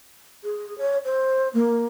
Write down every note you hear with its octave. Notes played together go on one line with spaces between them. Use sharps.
G#4
C#5
C5
A#3